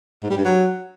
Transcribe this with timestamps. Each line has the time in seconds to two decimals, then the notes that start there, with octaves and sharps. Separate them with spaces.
0.23 G#2
0.30 G3
0.37 G2
0.45 F#3